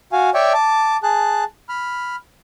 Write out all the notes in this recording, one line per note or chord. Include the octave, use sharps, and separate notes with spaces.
F#4 F5 G#5
C#5 D5 E5 G5 C#6
A5 D6
G#4 A5 F#6
B5 F6